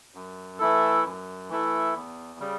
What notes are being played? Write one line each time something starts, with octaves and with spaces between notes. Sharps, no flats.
F#2
E3 A3 E4 A4
F#2
E3 A3 E4 A4
E2
C#3 G3